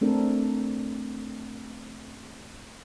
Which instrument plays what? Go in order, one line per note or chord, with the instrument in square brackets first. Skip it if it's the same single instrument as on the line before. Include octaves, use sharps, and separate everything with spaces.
[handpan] A3 C4 D4 A4 A#4